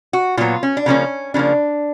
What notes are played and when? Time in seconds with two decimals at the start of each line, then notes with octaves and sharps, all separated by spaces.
0.13 F#4
0.37 A#2 F#3 B3 F4
0.63 C#4
0.77 D4
0.86 C#3 F3 A#3 C#4
1.34 C#3 F3 A#3 D4